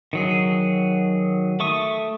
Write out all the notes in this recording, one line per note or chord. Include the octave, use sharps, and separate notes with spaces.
D#3 F#3 G#4
A3 C#6 D#6